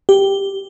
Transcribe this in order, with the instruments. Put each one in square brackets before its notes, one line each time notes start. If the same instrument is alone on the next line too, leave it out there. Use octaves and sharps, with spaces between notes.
[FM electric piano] G4